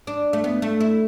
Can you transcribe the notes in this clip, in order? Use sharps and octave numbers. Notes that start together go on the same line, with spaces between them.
D4
A3
B3
A3
E4